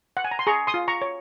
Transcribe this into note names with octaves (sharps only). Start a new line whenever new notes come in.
F#5
G#5
A#5
C6
G#4 A#5 C#6
C6 D#6
F4
A#5 C#6
C#5